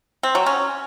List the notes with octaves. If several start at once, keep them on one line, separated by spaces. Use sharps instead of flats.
C4
F#3
C#4